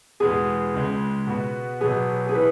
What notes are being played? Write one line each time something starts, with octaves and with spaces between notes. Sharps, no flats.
E2 B2 G#3 B3 G#4
C#2 C#3 G#3
B2 B3 F#4
B1 B2 F#3 B3 G#4
G#4
E3 B4